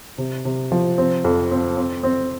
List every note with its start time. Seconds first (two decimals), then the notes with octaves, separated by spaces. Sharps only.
0.18 C3
0.45 C3
0.72 F3
0.98 C4
1.24 F2
1.51 C4
1.77 C4
2.03 C4